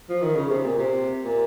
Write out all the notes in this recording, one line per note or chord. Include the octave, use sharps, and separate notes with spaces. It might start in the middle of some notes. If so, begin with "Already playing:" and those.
F3
D#3
C#3
C3
A#2
C3
A#2